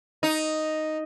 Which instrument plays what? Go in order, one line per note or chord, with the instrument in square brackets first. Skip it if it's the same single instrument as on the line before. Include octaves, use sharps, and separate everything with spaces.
[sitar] D#4